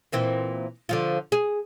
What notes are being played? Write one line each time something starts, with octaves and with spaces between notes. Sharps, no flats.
A#2 E3 C4
D3 F3 F4
G#4